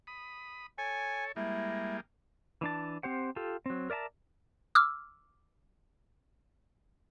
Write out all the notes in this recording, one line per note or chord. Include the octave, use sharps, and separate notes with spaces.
B5 D#6
A4 C#5 G#5
G3 G#3 A#3 E4
E3 D4 A5
C4 G4 C5 F#5
F4 G4 A4
F#3 C4
A#4 D5 E5 A5 A#5
D6 E6 F6